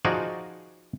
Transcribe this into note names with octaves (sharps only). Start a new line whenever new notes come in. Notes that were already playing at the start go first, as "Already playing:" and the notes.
F3 D#4 F#4 G#4 D5